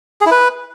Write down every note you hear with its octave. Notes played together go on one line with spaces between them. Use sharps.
G#4
E4
B4